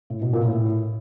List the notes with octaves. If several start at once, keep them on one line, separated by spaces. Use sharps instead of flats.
A2
B2
A#2
A2